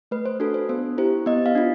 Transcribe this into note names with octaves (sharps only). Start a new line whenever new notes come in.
A3 B4
C5
D4 F#4 A4
C5
B3 C5
E4 G4 C5
B3 D#5
F5
D4 F4